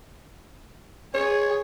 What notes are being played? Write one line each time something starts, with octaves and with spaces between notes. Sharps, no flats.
G#4 C#5